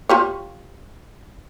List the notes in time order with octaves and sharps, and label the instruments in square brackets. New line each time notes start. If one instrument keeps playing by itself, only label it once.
[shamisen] F4 G4 C#5